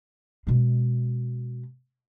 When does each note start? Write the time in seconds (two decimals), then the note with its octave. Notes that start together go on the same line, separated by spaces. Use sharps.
0.47 B2 G#3